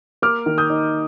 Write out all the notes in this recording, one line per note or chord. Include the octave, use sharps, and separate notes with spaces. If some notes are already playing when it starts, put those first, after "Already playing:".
A#3 D6 F6
D#3
D#6 G6
D#4